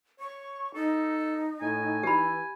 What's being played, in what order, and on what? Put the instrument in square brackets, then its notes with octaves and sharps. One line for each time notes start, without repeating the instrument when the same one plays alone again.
[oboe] C#5 [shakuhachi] C#6
[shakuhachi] D#4 [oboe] A4
[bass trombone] A2 [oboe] G#5
[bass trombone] E3 [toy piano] G4 B5